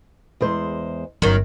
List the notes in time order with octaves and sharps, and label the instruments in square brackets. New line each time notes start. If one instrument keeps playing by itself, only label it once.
[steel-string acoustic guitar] E2 G#3 C5
[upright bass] G1 [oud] F#2 D#3